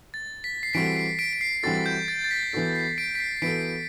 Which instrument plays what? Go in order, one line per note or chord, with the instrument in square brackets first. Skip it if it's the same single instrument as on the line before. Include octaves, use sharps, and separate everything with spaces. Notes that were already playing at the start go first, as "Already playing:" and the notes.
[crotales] A6
B6
C7
[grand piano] E3 G3 C4 F#4 A4 [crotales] B6 D7
[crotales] C7
B6 D7
B6
C7
[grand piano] E3 G3 C4 F#4 A4 [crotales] A6
[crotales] G6
A6
A6
B6
[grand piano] E3 B3 F#4 A4 [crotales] C7
[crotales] C7
B6 D7
B6
C7
C7
[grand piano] E3 B3 F#4 A4 [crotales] B6 D7